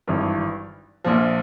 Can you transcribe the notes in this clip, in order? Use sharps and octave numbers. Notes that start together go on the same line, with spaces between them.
G#1 G2 E3
A#1 A#2 F3